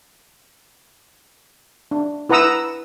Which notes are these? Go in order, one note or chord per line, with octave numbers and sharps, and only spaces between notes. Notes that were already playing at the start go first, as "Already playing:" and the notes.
D4
E4 B4 F#5 A#5 D#6 E6